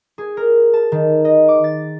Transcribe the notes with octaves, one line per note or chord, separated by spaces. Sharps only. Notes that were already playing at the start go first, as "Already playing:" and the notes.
G#4
A#4
A5
D#3
D#5
D6
A6